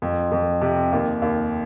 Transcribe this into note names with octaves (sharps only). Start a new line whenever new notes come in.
F2
F2
C3
D#2
D#2